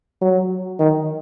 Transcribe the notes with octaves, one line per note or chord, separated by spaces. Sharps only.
F#3
D#3